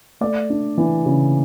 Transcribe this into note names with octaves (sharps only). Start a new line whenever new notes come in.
A3 D5
D4
E3
C#3